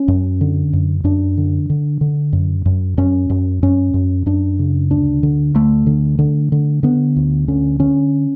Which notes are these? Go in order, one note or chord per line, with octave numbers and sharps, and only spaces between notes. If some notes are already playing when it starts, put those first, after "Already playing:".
Already playing: C#4
F#2
D3
F#2
F#2 D4
D3
D3
D3
F#2
F#2
F#2 C#4
F#2
F#2 C#4
F#2
F#2 D4
C#3
D2 D4
D3
D2 A3
D3
D3
D3
D3 B3
D2
D3 C#4
D3 C#4